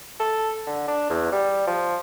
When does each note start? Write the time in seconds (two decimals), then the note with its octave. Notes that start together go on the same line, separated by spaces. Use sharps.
0.20 A4
0.67 D3
0.88 D4
1.10 E2
1.32 G3
1.67 F3